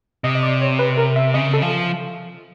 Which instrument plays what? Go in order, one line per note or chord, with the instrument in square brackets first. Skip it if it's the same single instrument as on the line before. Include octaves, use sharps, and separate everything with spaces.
[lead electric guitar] C3 [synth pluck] D#5
[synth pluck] D#5
D5
C#5
B4
A#4
E5
[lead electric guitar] C#3 [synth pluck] D#5
[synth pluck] A4
[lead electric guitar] F3